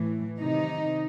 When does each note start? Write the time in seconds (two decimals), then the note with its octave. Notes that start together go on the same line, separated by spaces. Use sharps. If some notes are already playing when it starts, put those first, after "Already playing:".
Already playing: A2 E3
0.40 C3 D#3 D#4